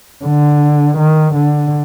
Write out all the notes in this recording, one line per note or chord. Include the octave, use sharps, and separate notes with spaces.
D3
D#3
D3